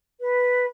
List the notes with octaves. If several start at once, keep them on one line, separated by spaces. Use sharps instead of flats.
B4